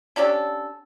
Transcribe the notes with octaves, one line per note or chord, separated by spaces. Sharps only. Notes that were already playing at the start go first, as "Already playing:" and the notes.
C#4 D4 G4 A4